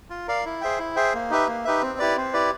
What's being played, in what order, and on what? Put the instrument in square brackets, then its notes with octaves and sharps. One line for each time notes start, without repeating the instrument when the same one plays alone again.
[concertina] F4
A#4 D5 F5
E4
G#4 C5 E5 G5
E4
G#4 C5 E5 G5
A#3
D#4 G4 B4 E5
A#3
D#4 G4 B4 E5
C4
E4 G4 B4 D5
C4
E4 G4 B4 D5